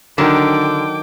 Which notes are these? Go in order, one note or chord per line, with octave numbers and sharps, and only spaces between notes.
D3 D#3 F#3 D4 G5 D6